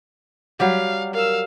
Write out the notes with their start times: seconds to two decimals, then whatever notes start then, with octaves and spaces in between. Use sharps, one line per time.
0.60 F#3 G3 G4 F5
1.14 A#4 F5 E6